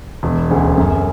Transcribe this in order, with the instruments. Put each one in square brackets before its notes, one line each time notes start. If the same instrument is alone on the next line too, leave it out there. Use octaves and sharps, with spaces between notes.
[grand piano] E1
D2 C#3
F#2